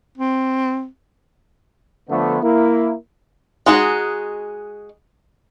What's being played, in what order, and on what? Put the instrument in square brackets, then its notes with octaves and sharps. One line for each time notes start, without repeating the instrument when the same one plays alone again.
[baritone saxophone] C4
[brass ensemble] D3 F3 A3 B3
A#3 E4
[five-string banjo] G#3 D#4 F#4 G#4